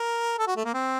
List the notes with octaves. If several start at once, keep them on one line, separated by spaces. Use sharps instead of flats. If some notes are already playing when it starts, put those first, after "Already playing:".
Already playing: A#4
A4
F#4
A3
A#3
C4